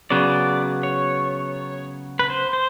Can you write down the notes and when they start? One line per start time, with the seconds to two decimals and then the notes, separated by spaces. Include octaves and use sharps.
0.10 C#3 F#3 B3 D5
0.83 C#5
2.19 B4
2.30 C5
2.53 C5